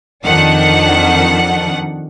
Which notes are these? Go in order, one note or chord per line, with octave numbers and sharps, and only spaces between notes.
F2 D#3 D4 F#5